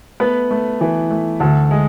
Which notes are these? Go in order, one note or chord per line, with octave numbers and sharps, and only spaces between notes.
A3 B3 B4
A3
E3
A3
D2 A4
G#3